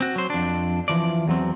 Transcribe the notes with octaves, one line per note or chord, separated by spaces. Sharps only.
C4 F#4
F#3 C5
F2 D4
E3 F3 D5
E2 F#3 C4